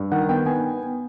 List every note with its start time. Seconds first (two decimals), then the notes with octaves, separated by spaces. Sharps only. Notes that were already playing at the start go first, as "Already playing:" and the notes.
Already playing: G2
0.12 D#3 F#5
0.29 B3 G5
0.46 B3 G#5